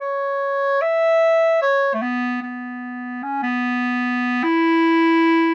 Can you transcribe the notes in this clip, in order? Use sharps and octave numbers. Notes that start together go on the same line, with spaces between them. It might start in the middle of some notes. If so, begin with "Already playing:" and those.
C#5
E5
C#5
A3
B3
B3
C#4
B3
E4